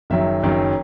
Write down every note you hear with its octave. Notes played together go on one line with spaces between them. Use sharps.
F#1 F#2 D#3 F#3 E5
F#1 F#2 D#3 F#3